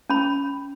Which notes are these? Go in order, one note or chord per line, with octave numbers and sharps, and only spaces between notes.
C#4 B5